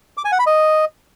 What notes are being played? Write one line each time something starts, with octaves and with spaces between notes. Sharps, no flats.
D6
G#5
F#5
B5
D#5